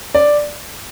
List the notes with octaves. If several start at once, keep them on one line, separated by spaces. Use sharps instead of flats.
D5